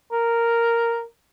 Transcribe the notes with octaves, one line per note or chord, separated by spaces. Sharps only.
A#4